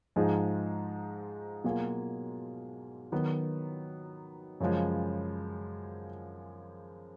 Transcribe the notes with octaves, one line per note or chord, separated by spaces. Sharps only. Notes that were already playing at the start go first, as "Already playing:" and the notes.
G#2 F3 G#3 D#4 G#4
B2 F#3 A#3 F4 G#4
D#3 F#3 B3
F#2 C#3 F3 G#3